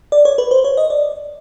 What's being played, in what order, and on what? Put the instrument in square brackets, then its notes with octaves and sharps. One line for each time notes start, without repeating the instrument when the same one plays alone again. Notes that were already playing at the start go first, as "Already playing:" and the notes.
[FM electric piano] D5
C#5
B4
C5
C#5
D#5
D5